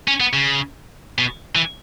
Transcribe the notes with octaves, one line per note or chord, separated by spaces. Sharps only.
C#4
B3
C#3
B2
E3